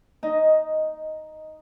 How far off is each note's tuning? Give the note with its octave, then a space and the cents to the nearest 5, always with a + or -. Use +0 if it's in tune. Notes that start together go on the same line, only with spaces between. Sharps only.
D#4 +0 D#5 +10